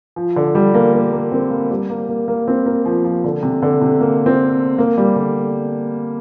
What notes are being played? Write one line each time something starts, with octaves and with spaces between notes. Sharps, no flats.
F3
D3
G3
A#3
A#3
A#3
C4
A#3
G3
A#3
A#3
A#3
C4
A#3
F3
F3
D3
C3
D3
C3
A#3
C4
A#3
G3
D3